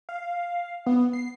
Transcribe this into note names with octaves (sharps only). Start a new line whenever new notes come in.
F5
B3
C7